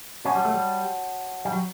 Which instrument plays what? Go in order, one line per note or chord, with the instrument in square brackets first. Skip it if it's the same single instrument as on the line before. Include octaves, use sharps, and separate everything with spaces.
[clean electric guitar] C#4 [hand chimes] F#4 C#5 F#5 A5
[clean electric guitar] G3
A3
G3
G3
F#3